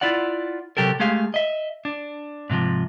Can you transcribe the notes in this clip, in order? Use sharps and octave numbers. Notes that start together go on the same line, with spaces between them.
E4 F4 D5 F#5
C3 E3 F#3 G4 A4 A#4
G#3 A3 G4 G#4 F5
D#5 E5
D4
G#2 C3 E3 F3